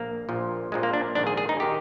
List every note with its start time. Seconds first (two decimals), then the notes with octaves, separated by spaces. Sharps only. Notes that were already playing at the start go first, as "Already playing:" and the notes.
Already playing: A#1 A#3
0.29 A#1 A#2 F3
0.72 A#1 A#2 F3 G#3
0.83 A#3
0.93 D4
1.15 A#1 G#2 D#3 D4
1.27 G#4
1.37 G#4
1.49 D#4
1.60 D#3 G4